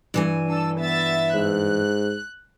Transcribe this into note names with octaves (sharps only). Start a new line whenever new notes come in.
G2 E3 G#5
D4 A4 E6
B3 E5 A6
G#2 F#6